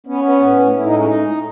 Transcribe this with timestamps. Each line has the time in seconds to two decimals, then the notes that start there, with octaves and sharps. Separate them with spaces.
0.07 B3 C#4
0.24 B3
0.41 A2
0.58 A2
0.75 A2 E4
0.85 D#4
0.92 G#3 C#4
1.05 D#4